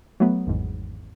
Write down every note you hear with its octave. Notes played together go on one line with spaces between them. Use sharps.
F#3 A3 B3
G#1 E2 G#2